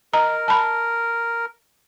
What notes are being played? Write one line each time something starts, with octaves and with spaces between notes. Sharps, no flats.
A#4 D#5 A#5
A5 B5